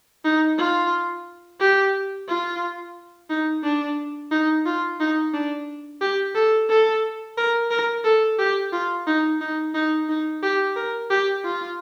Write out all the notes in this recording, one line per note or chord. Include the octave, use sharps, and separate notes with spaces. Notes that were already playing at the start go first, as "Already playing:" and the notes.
D#4
F4
G4
F4
D#4
D4
D#4
F4
D#4
D4
G4
A4
A4
A#4
A#4
A4
G4
F4
D#4
D#4
D#4
D#4
G4
A#4
G4
F4